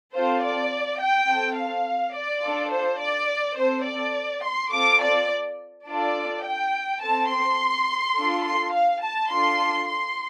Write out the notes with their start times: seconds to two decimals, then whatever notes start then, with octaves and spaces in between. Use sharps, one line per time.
0.13 C4 F4 A4 C5
0.42 D5
1.00 G5
1.29 C4 A4
1.57 F5
2.15 D5
2.43 D4 F4 A4
2.72 C5
3.00 D5
3.58 C4 A4 C5
3.86 D5
4.44 C6
4.72 C4 F4 A4 D6
5.01 D5
5.87 D4 F4 A4 D5
6.44 G5
7.01 C4 A4 A5
7.30 C6
8.16 D4 F4 A4
8.44 C6
8.73 F5
9.02 A5
9.30 D4 F4 A4 C6
9.88 C6